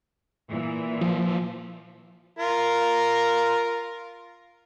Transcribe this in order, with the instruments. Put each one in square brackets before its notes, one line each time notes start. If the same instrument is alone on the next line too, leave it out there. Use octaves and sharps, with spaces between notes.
[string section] A#2 E3
[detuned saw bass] F3
[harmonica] F4 A#4